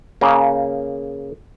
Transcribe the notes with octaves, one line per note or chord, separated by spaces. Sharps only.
C#3 A#3